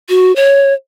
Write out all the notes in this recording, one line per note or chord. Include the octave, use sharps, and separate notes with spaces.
F#4
C#5